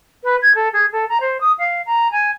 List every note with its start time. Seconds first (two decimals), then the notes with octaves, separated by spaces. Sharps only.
0.24 B4
0.42 G#6
0.55 A4
0.73 G#4
0.92 A4
1.09 A#5
1.21 C5
1.41 D#6
1.59 F5
1.86 A#5
2.12 G#5